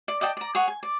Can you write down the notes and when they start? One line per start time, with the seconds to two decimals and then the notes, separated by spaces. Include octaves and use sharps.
0.08 D5
0.21 D5 D#5 G5 A5
0.37 D5 A#5
0.55 G#4 C#5 F#5 C#6
0.68 G#5
0.83 D5